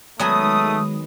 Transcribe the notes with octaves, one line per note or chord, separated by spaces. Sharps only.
D#3 F#3 G#3 A3 B3 G#5 D#6